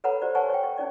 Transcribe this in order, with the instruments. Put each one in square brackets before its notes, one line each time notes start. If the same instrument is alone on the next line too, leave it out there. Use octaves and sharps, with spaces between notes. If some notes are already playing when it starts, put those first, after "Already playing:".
[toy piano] A4 B4 C#5 F#5 A#5 B5
G4 C5 D5
B4 C#5 F#5 G#5 A5 C#6
C#5 G5
C#6
C#4 D#4 D5